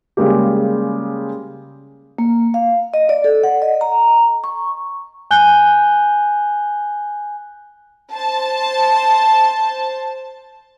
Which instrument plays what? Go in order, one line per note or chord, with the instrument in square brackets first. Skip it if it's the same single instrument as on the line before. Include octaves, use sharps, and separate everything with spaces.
[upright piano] C#3 G3 G#3 A#3 G4
[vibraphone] A#3
F5
D#5
D5
A4
F#5
D#5
A#5
C#6
[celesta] G#5 F#6 G6 G7
[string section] C5 A5